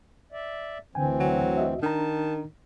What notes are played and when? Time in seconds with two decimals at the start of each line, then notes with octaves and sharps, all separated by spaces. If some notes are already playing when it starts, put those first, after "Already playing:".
0.32 D5 E5
0.95 D2 D3 E3 C4 G5 G#5
1.20 F#3
1.57 F#4 D#5 E5
1.83 D#3 D4 A5 A#5